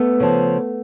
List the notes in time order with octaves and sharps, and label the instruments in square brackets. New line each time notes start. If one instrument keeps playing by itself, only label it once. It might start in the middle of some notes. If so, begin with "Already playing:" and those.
Already playing: [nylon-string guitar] A3 B3
C#3 F3